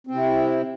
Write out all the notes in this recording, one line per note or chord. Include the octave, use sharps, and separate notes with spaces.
C3 C4 E4